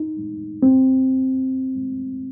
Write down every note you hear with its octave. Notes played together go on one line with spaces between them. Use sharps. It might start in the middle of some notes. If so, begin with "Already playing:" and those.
Already playing: D#4
C4